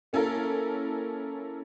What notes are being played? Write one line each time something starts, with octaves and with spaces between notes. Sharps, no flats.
A#3 C#4 E4 A4 A#4